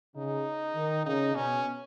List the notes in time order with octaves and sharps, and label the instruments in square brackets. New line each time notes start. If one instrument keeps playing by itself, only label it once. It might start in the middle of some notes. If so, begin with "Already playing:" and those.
[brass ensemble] C#3 [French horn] D#4
[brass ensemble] D#3
[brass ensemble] C#3 [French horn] D#4
[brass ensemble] B2 [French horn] C#4